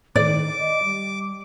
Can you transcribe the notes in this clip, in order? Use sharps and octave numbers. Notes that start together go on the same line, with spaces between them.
A2 D#3 D5 D6
D#5
G3